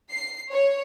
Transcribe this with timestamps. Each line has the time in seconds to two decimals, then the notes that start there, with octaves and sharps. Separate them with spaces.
0.11 C7
0.52 C#5